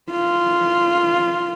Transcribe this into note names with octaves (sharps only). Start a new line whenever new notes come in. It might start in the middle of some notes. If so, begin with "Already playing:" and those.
F4